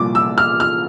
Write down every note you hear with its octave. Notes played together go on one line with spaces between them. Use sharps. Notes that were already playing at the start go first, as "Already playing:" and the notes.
Already playing: C2 A#2 F3 D6
E6
F6
F6